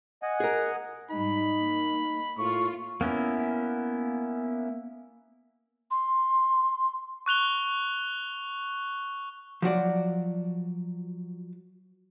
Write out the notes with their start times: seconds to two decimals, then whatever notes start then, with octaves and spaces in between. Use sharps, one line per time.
0.23 D#5 F#5 G#5
0.40 G#4 A#4
1.11 G#2 G3 D#4 B5
1.57 A#3
2.37 A2 A#3 F4 C#6
3.01 A#3 B3 C#4 E4
5.91 C6
7.26 C#6 F#6 F7 G7
9.62 F3 F#3 F#4 D5